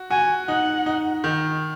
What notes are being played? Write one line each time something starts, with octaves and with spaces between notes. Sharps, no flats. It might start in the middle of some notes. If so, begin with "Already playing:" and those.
Already playing: F#4
F#4 G#5
D#4 F#5
D#4
D#3